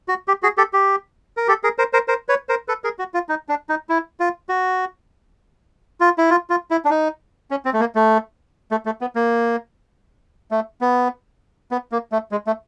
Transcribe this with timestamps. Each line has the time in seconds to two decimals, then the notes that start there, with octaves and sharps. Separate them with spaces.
0.08 F#4
0.28 G4
0.43 F#4 G#4
0.58 G4 A4
0.73 G4
1.37 A#4
1.48 G4 A4
1.63 G#4 A#4
1.78 A#4 C5
1.93 A#4 C5
2.08 A#4 C5
2.28 B4 C#5
2.49 A#4 C5
2.68 A4 B4
2.84 G#4 A#4
2.99 F#4
3.14 F4
3.29 D#4
3.49 D4
3.69 D#4
3.89 E4
4.20 F4
4.49 F#4
6.00 F4
6.18 E4
6.30 F4
6.50 F4
6.71 E4
6.85 D4
6.90 D#4
7.51 C#4
7.65 C4
7.73 A3
7.80 A#3
7.95 A3
8.71 A3
8.86 A3
9.01 B3
9.16 A#3
10.51 A3
10.81 B3
11.71 B3
11.92 A#3
12.12 A3
12.31 G#3
12.47 A3